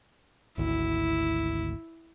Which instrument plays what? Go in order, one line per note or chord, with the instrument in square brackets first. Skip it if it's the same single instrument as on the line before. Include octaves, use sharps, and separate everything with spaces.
[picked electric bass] G#1 D2 [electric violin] E4